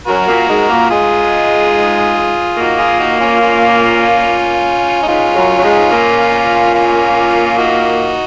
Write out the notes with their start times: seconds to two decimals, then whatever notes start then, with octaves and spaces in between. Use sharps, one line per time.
0.07 F#2 F#3 F#4 A#4
0.28 A#2 A#3
0.49 G#2 G#3
0.70 A#2 A#3
0.90 G#2 G#3 F4 G#4
2.57 A#2 A#3 D#4 F#4
2.78 F4 G#4
3.00 D#4 F#4
3.20 C#4 F4
3.41 C#4 F4
5.03 D#4
5.07 G#2 G#3 C#4 F4
5.36 F#2 F#3
5.58 F#3
5.63 G#2 G#3
5.91 A#2 A#3
6.75 C#4 F4
7.58 D#4 F#4